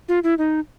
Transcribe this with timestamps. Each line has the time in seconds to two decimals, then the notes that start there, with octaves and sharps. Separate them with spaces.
0.09 F4
0.24 E4
0.38 D#4